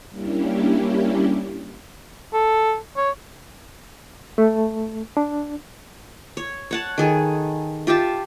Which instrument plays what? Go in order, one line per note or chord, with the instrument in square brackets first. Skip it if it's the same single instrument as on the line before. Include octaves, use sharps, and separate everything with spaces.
[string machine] G3 A#3 C#4 D4 E4 G4
[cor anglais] A4
C#5
[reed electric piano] A3
D4
[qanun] C#5
C#5 F#5 A5
D#3 G#4 A4
F4 G4 E5 A5